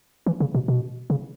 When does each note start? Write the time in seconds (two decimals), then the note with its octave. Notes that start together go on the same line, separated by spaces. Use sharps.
0.26 E3
0.40 C#3
0.54 B2
0.68 B2
1.10 C#3